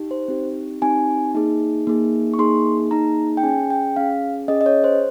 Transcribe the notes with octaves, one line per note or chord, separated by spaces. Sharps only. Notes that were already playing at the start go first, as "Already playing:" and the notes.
Already playing: D#4 G4
C5
C4 D#4 G4
C4 D#4 G4 G#5
A#3 D#4 G#4
A#3 D#4 G#4
C#6
A#3 D#4 G#4 C6
A#3 D#4 G#4 A#5
G5
C#4 G#4 G#5
G5
C#4 G#4 F5
C#4 G#4 D#5
D#5
C#5
C5